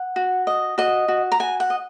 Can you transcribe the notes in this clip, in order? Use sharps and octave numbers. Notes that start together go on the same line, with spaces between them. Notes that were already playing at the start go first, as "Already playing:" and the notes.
Already playing: F#5
F#4
D#5
F#4 D#5
F#4
A#5
F#4 G#5
F#5
D#5